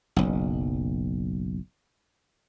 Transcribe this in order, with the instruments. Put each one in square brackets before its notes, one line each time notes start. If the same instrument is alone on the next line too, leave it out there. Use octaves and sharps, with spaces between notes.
[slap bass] F#1 B1